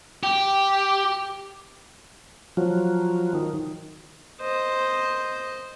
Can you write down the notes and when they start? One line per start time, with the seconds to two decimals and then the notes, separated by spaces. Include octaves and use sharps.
0.23 G4
2.57 F3 F#3
3.35 D#3
4.41 C5 D#5